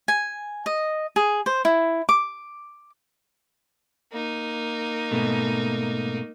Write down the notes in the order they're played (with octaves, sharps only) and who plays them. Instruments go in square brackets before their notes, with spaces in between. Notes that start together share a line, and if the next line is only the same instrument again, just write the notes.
[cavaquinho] G#5
D#5
G#4
C5
E4
D6
[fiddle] A#3 D#4
[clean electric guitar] G#2 B2 A3